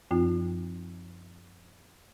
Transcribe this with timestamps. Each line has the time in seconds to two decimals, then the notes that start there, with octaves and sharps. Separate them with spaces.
0.11 F#2 F3 C4 F4